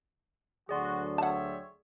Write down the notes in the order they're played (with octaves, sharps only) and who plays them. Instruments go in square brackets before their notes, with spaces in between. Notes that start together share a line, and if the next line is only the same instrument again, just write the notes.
[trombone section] D2 D3 F#3 [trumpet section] F#4 [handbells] G#4 D5 C6
[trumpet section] C4 C#5 E5 [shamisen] F#5 A5